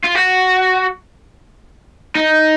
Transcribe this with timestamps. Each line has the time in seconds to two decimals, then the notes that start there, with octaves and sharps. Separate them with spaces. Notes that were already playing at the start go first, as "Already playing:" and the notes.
0.04 F4
0.15 F#4
2.15 D#4